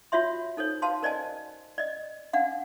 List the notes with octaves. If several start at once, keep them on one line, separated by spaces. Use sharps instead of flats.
F4 F#4 C#5 E5 C6
D#4 A4 C5 C#5
F#4 B4 F5 A5 C6
A#4 C5 D5 D#5 G#5 A5
D5 D#5
D4 F5 F#5